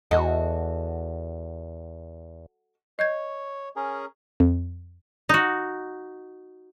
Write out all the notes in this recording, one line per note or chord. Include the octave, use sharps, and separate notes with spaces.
E2 F#4 A4 D#5
C#5 D#5 G6 G#6
C#4 G#4 A#4
F2
D#4 F#4